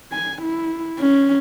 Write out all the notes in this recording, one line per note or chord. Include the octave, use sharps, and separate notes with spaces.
G#5
E4
C#4